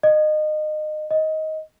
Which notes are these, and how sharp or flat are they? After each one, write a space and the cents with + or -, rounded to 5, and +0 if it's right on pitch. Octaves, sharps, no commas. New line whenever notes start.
D#5 -25
D#5 +15